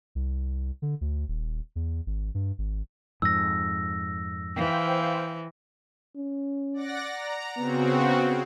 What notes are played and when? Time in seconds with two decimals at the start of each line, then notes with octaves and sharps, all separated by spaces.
0.15 C2
0.82 D3
1.01 D2
1.28 D#1
1.76 E2
2.06 G#1
2.34 G2
2.58 G#1
3.22 F2 G#2 E6 A#6
4.56 E3 C5 F5 G5
6.17 C#4
6.74 D5 F#5 A#6
7.12 A#5
7.58 C#3 B3 C4 F#4